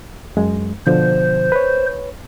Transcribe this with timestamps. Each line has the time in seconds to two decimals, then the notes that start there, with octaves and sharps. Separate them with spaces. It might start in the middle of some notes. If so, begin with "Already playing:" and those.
0.37 F#2 G#3
0.87 B2 D3 F3 C5
1.52 B4 C#5